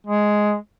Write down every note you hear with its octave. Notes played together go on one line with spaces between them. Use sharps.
G#3